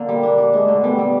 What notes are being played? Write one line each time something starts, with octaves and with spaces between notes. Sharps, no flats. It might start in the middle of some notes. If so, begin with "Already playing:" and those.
Already playing: D3 A#3
G3
D4
D4
G#3 D4
D3 A3
G3 B3
G3